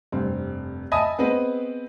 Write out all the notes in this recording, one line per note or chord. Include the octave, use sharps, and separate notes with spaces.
F1 G2 C4
D#5 E5 G#5 A5 B5 D#6
B3 C4 G#4 B4 D#5